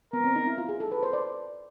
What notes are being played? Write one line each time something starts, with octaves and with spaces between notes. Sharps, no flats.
B3 A#4
C4
D#4
E4
F4
G#4
A4
B4
C5
D5